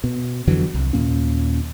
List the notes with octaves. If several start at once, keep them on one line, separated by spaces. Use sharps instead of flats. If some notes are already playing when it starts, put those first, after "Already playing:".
B2
F2 D3 E3 F#3
C2
D#2 A#2 A#3 C#4